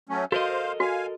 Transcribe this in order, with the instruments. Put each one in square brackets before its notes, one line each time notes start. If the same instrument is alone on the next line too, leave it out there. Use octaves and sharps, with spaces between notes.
[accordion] F#3 A3 C#4
[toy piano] F#4 [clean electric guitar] A4 A#4 D#5 [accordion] C5 F5
[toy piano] F#4 [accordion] F5 G#5